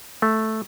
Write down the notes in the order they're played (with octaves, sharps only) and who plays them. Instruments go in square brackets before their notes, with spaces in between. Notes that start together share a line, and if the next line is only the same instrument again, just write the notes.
[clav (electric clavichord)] A3